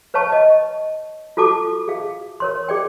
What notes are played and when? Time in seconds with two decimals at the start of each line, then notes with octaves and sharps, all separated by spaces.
0.14 B4 C#5 F5 A5 C#6
0.32 D#5 A5
1.37 F4 F#4 A4 A5 D6
1.88 G#4 F5
2.40 A#4 C#5 C6
2.68 G#4 D5 G5